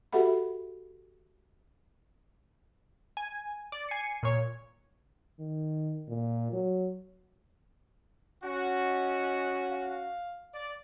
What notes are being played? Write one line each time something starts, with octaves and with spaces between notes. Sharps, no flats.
F#4 G4 A4 E5 F#5 B5
G#5
D5
G#5 C7 C#7
A#2 C#5
D#3
A#2
F#3
C#4 F#4
D#5
F5
D5